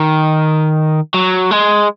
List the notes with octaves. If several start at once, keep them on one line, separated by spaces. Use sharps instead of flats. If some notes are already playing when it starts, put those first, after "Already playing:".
Already playing: D#3
F#3
G#3